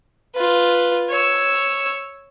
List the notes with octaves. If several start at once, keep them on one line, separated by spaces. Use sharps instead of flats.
F4 B4
C#5 E6